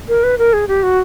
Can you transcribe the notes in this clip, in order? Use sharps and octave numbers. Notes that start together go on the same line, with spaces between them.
A#4
B4
A#4
G#4
G4
F#4